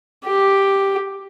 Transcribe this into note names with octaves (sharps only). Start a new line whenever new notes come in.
G4